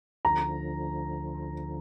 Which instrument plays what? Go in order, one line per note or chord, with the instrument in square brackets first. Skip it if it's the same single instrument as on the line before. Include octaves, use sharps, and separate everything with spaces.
[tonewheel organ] D2 D3 F3 [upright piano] A#5